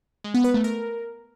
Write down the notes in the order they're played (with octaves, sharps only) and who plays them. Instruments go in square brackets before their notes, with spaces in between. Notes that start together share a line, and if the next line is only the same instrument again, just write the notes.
[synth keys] G#3
B3
B4
A3
A#4